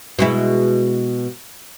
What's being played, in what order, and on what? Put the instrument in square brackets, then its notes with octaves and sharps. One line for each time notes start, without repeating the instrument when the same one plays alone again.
[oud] B2 G#3 E4